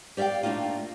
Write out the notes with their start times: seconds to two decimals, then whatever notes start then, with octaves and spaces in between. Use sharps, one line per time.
0.17 G4 D5 E5 F5 G5
0.43 A3 A#3 C4 D4 D#4 F4